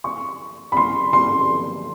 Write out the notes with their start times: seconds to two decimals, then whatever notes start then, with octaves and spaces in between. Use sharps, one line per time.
0.04 C#6
0.72 B5
0.77 C6
1.13 C6